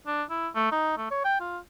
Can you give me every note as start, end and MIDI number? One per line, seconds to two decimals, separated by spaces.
0.07 0.23 62
0.30 0.48 64
0.55 0.71 57
0.72 0.96 63
0.98 1.09 57
1.11 1.20 73
1.25 1.40 79
1.40 1.58 65